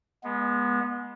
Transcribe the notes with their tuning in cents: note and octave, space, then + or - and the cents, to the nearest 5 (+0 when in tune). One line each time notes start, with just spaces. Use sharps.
G#3 +0 B3 -25